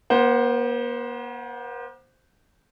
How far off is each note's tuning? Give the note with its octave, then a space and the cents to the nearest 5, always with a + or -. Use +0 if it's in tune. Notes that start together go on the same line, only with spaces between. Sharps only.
A#3 +45 C5 +0 F#5 +10